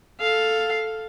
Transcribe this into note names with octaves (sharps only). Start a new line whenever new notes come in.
A4 F5